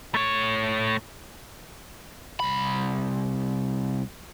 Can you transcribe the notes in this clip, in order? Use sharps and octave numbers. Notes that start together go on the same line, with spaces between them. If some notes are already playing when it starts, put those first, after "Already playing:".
A3 C#5
C2 B5